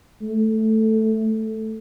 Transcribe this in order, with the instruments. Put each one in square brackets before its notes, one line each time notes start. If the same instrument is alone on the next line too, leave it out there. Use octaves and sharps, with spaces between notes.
[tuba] A3